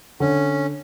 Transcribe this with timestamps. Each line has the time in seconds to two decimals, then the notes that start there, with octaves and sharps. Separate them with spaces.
0.20 D3 C#4